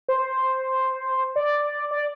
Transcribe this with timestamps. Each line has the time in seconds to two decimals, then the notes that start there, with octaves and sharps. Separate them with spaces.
0.09 C5
1.36 D5
1.91 D5